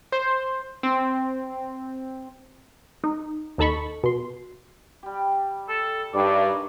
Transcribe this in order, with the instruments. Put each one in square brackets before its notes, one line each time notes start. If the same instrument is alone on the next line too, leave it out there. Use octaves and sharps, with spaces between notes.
[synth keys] C5
C4
[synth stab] D#4
D#2 D#4 A4 A5 B5 C#6
B2 C6
[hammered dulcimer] G3 G4
[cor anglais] A4
[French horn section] G2 [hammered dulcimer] D#3 F#3 B5 [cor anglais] D5